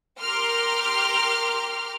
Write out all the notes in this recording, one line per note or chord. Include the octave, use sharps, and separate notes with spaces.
G4 A#4 C6 D6 F6